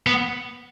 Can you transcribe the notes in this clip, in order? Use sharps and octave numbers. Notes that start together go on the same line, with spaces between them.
B3